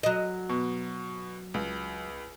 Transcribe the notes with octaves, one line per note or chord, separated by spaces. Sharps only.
F#3 D#5
B2
C#2